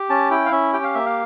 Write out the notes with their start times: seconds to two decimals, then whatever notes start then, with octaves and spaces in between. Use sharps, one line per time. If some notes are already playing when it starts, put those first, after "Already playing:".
Already playing: G4
0.09 C#4 A5
0.31 E4 G5
0.45 F5
0.51 C#4 E5
0.73 G4 G5
0.84 F5
0.95 A#3 E5
1.06 F5